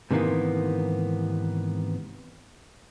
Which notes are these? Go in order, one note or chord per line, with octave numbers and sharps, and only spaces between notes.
G#2 C3 D#3 E3 A#3 B3